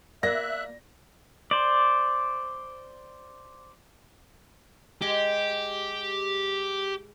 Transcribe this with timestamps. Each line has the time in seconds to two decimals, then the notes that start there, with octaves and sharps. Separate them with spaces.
0.23 A#3 F4 D5 E5 F#6 A#6
1.51 C5 D5
5.02 G#3 G4